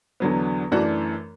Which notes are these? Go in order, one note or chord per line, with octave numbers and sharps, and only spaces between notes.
E2 D3 F#3 B3
F#2 E3 A3 D4 F#4